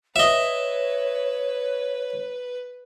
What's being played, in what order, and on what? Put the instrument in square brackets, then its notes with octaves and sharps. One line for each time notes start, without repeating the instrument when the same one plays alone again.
[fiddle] B4 [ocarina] C#5 [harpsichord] D#5 E5